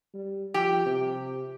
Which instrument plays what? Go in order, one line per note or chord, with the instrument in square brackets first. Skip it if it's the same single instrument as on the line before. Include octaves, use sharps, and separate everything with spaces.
[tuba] G3
[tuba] F3 [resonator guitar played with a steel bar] G4
[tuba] C3